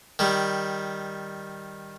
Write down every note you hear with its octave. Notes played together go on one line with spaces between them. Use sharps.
D#3 G3